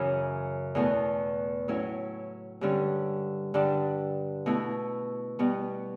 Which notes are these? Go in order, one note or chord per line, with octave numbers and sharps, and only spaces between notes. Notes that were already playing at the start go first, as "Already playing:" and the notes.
Already playing: F#2 C#3 E3
E2 B2 A3
A2 F#3 C#4 E4
G2 D3 G3 C#4
G2 D3 G3 D4
B2 A3 E4
B2 G3 B3